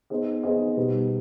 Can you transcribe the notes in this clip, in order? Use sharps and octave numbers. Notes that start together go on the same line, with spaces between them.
B3 D#4 G#4 C5 D#5
B3 D#4 G#4 C5 D#5
B2 G3 B3 D#4